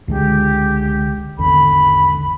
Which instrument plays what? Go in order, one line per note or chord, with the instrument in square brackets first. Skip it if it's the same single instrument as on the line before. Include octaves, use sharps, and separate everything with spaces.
[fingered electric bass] C#2 D3 G#3 [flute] G4
[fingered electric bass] G#1 E2 D3 [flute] B5